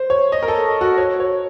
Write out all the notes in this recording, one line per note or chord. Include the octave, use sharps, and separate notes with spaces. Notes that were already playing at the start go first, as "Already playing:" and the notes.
Already playing: C5
C#5
D#5
A#4
A4
F#4
C#5
C#5